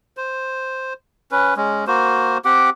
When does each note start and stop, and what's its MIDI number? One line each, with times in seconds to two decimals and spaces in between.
0.17 0.93 72
1.32 1.54 61
1.32 1.54 71
1.57 1.85 56
1.57 1.85 61
1.87 2.38 58
1.87 2.38 66
1.87 2.38 72
2.45 2.70 60
2.45 2.70 67
2.45 2.70 78
2.45 2.70 86